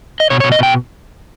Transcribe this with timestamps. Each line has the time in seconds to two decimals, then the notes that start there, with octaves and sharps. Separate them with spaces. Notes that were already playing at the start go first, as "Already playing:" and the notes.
0.20 D#5
0.30 B2 C#5
0.40 B2 C#5
0.52 D#5
0.59 B2 G5